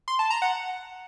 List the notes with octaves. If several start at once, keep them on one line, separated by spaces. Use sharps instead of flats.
C6
A5
A#5
F#5